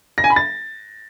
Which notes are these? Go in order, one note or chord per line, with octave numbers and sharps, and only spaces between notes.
A#6
G#5
B5
A6